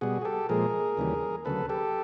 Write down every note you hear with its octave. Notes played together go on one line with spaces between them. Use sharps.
B2 G3 F#4 G#4
G#4
G4 A4
A#2 F3 G#3 G#4 A#4
D#2 C#3 E3 G3
D2 C#3 F#3 A4 B4
G4 A4